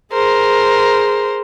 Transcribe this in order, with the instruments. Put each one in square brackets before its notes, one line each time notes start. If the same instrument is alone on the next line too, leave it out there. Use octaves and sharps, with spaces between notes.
[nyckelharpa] G#4 [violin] A#4 C5